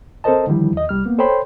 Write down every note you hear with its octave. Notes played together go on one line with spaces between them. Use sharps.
C4 A4 A#4 C5 D#5 A5
D3 D#3 F3 G3 E4
D#2 D#5
C2 G3 F6
A#3 B3
A4 C5 C#5 G5 B5 C6